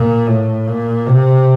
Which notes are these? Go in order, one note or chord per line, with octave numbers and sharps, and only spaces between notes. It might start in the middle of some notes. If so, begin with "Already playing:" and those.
Already playing: A#2
A2
A#2
C3